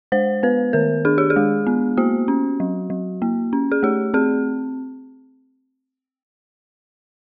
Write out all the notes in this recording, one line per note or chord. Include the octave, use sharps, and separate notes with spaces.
G#3 C5
B3 B4
D#3 A#4
D4 G#4
G4
G#4
G#3
B3
A#3 F#4
C#4
F#3
F#3
A#3
C#4
G#4
A3 G4
C4 G#4